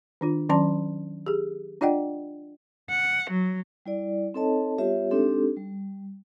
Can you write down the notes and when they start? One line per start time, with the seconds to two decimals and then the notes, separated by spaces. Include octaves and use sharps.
0.21 D#3 D4 F4
0.49 D#3 F#3 C#4 D5 A5 C6
1.26 G4 G#4
1.81 D4 F4 D5 D#5 F#5 G5
2.89 F#5
3.30 F#3
3.86 G3 E4 D5
4.34 C4 D#4 A4 C#5 D#5 A5
4.78 G3 B3 F4 G4 C#5 E5
5.11 G#3 C4 D4 D#4 G4 A4
5.57 G3